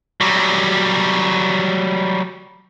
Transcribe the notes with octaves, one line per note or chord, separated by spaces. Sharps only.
F#3 G3